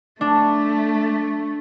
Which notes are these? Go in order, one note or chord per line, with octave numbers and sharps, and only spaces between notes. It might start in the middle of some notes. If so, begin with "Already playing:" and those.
A3 D4